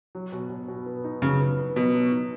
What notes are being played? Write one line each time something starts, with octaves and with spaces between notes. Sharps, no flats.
F#3
B2
B2
B2
B3
D#4
C#3 F#3
B3
B3
B2 F#3
F#3
D#4